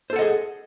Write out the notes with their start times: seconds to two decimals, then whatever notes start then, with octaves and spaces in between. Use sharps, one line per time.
0.10 C5
0.13 A4
0.16 F#5
0.19 D#5
0.22 G#4